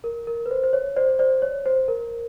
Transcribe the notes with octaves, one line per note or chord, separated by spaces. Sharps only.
A#4
A#4
B4
C5
C5
C#5
C5 D5
C5 D5
C#5
C5
A#4